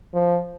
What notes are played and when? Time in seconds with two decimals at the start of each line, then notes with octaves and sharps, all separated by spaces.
0.14 F3